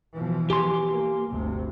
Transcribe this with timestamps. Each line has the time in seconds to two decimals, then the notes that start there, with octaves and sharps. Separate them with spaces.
0.15 B2 E3 F3
0.50 G4 G#5 C6
0.90 A#3
1.31 G1 D2 C3